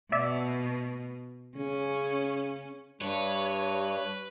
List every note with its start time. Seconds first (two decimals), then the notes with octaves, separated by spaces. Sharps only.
0.12 B2 D5 E5
1.57 C#3 C#4
3.01 G2 G3 B4 C#5